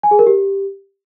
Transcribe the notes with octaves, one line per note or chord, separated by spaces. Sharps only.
G#5
G#4
A#4
G4